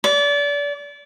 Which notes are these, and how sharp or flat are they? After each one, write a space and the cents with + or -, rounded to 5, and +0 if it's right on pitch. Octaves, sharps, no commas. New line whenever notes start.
D5 -30